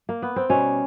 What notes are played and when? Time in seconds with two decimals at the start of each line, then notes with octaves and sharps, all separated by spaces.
0.09 A#3
0.22 B3
0.36 C4
0.49 B2 G3 C#4